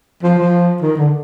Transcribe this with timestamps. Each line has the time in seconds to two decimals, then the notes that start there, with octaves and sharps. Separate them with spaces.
0.23 F3
0.38 F3
0.82 D#3
0.97 D3